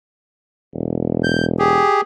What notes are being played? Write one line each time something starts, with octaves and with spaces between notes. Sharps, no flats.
E1
G6
G4 G#4